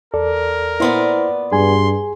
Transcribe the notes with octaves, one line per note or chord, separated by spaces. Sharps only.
E2 A4 A#4 D5
A#2 B3 E4 C5 D5 C6
G2 G#4 G#5 C6